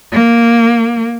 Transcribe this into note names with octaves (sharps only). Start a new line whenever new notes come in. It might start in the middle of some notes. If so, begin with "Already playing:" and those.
A#3